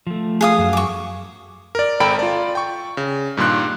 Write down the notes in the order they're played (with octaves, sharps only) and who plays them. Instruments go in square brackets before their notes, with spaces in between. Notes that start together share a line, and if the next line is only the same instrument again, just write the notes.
[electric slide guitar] F3 A3
[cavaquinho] G#4 F5 D#6
[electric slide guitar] F#2 F#3
[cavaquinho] C#6 D6
[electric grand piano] A#4 D5
G#1 A4 G5 A#5 B5 D7
F4 D5
G5 C#6
C#3
G2 A#2 D#3 C6 F#6